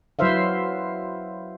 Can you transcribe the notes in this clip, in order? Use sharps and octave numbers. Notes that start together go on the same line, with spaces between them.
F#3 E4 B4 C5 E5 F5